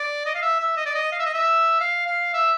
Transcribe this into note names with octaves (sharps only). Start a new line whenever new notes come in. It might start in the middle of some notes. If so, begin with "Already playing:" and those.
Already playing: D5
D#5
F5
E5
E5
D#5
D5
D#5
F5
E5
D#5
E5
F5
F5
E5